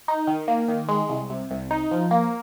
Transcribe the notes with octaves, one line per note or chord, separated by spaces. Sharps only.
D#4
D#3
A#3
D#3
G#3
C2
C3
C2
D#4
F3
A#3